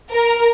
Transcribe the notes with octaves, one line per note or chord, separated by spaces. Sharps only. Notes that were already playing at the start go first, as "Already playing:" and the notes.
A#4